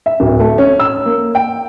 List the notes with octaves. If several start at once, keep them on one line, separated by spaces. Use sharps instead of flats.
E5
D1
A3
C#4
E6
A#3
G5